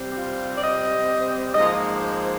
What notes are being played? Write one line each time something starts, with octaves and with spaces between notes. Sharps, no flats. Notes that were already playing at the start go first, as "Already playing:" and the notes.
Already playing: C3 G3 C4
G4
F4
D5
D#5
G#2 F3 A#3 D#5
C5